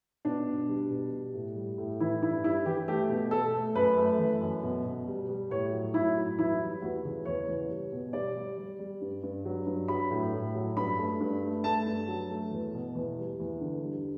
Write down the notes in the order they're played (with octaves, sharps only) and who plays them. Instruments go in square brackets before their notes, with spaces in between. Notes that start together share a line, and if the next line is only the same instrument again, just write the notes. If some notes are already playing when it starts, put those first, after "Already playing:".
[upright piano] B2 D4
B2
G3
B2
G3
A2
G3
A2
E3 E4
G2 E4
G3 E4
E3 G4
A3 G4
B2
A3 A4
A3
F#2 B4
A3
E3
F#2
B2
B2
G3
G3
A2 C#5
F#3
A2 E4
F#3
E2 E4
G3
E2 F#4
C#3
E2 C#5
E2
G3
B2
G3 D5
G3
G3
G3
G2
G2
F#3
G2
F#3 B5
A2
A2
F#3
G2 B5
A3
G2
A3
A3 A5
G2
F#3
A3
E2
B2
E2
G3
E2
D3
G3